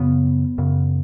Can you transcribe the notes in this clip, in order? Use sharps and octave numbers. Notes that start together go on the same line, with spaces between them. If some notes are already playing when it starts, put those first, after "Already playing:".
Already playing: F#2 C#3 B3
F#2 C#3